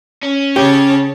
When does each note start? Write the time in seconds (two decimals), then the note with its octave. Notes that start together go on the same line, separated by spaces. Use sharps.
0.23 C#4
0.56 C#3 G4 C#5 A5